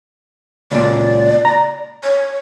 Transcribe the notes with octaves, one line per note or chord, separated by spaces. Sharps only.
C#2 A#2 D5
A#5
C#5